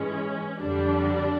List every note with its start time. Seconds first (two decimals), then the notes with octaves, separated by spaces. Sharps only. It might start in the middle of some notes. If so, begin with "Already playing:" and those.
Already playing: G#2 E3 G#3 C#4
0.59 F2 D3 G3 D4